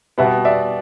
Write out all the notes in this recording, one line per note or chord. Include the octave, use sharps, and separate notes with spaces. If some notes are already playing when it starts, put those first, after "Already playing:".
B2 G3 B3 E5 F#5
D5 E5